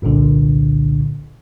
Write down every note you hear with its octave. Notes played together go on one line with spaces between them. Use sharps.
G1 C2 A#2 D3